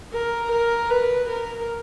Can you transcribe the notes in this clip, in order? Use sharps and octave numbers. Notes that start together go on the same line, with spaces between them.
A#4
A#4
B4
A#4